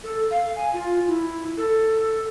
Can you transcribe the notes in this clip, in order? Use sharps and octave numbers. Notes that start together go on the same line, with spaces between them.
A4
F5
G#5
F4
E4
A4